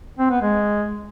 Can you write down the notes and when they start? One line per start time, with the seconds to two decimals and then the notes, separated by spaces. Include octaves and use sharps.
0.19 C4
0.31 B3
0.42 G#3